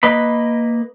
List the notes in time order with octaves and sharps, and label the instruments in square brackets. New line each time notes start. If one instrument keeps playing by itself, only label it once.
[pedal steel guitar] A#3 B4 D#5 B5